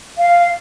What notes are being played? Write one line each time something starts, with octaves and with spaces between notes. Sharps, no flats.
F5